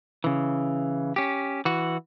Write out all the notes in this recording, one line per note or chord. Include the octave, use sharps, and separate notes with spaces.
C#3 E3
C#4 G4
E3 F#4